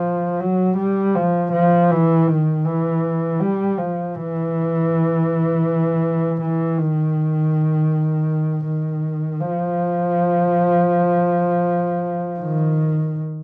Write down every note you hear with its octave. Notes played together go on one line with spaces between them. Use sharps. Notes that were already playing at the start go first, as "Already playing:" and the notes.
Already playing: F3
F#3
G3
F3
F3
E3
D#3
E3
G3
F3
E3
E3
D#3
D#3
F3
D#3